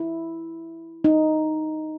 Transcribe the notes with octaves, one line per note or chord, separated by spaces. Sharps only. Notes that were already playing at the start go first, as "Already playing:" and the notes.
Already playing: E4
D#4